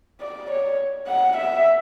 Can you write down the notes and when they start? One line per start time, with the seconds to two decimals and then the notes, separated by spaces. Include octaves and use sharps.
0.21 D5
0.50 C#5
1.07 F#5
1.37 E5